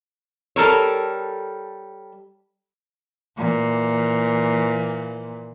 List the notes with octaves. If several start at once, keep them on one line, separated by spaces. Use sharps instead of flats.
G3 A4 A#4 C#5
A#2 E3